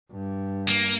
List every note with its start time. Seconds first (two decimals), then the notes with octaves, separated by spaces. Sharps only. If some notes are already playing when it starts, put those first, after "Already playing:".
0.11 G2
0.68 A#3